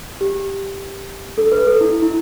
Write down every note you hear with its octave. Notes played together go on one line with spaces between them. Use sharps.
G4
A4
B4
A4
E4
E4